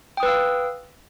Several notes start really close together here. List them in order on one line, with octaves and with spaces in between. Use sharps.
G5 D#6 B4 E6 F5